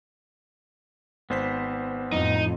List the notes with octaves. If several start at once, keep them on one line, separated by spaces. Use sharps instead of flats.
G#1 B3 C5 B6
F2 A2 D#4